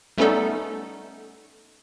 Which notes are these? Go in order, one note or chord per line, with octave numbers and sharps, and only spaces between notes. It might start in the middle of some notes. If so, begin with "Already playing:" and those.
G3 A3 B3 C#4 D#4 A4